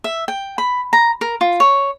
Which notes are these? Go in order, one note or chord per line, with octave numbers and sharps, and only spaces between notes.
E5
G5
B5
A#5
A#4
F4
C#5